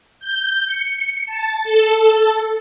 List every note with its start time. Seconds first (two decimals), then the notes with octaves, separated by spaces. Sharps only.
0.20 G6
0.66 C#7
1.26 A5
1.64 A4